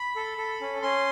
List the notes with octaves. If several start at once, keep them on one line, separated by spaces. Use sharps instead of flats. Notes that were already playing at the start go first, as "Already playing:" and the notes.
Already playing: B5
A4
A4
C#4
C#4 C6